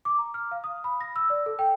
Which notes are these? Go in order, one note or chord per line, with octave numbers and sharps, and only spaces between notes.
D6
A#5
F6
F5
D#6
B5
A#6
E6
D5
A4
G5